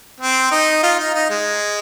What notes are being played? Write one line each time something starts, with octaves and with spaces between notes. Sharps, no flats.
C4
D#4
F4
D#4
D#4
G#3